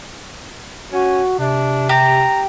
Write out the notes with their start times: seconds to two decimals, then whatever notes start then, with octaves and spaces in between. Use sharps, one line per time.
0.92 C#4 F#4
1.39 C3 D4
1.89 G4 A#5